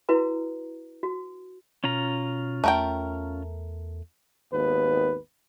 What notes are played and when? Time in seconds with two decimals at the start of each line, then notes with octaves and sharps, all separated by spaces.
0.09 E4 F#4 B4 A#5
1.03 F#4
1.84 B2 C#4 F4 A#5
2.64 E2 A3 A#4 G5
4.52 G#1 D#2 B3 B4